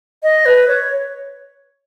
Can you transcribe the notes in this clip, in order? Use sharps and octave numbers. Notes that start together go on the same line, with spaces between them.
D#5
B4
C#5